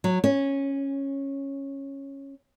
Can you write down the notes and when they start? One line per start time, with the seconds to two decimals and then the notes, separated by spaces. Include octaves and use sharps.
0.04 F#3
0.24 C#4